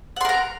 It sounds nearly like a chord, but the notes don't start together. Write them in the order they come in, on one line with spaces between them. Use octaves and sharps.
F#5 C6 A#4 A#5